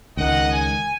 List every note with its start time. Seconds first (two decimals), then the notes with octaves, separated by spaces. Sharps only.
0.17 C#2 D#3 D#5 F#5
0.51 G#5